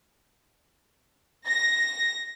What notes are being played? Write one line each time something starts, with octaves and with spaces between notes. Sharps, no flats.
A#6